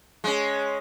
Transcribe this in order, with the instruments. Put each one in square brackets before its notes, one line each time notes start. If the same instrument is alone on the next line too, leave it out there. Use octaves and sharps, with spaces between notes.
[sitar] G#3 C#4